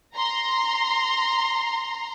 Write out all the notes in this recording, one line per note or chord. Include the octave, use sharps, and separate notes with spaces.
A#5 C6